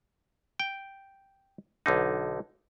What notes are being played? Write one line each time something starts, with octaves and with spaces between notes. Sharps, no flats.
G5
B1 D3 D#4